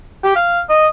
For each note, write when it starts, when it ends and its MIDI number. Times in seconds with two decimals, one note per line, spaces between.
0.24 0.35 67
0.35 0.60 77
0.69 0.86 75